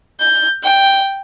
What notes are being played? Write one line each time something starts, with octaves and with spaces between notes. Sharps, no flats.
G6
G5